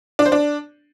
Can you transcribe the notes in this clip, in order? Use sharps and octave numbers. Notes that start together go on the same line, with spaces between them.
D4
C5
D4